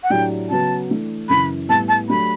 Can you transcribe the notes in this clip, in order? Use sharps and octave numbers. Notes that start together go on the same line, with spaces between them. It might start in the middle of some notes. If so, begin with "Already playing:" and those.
F#5
A2 F#3 A3 D4 G4 G5
C#3 F#3 B3 F#4 B4 A5
E3 A3 D4
F#2 C#3 E3 B5
A2 G3 B3 A5
A5
F#3 A3 D4 G4 B5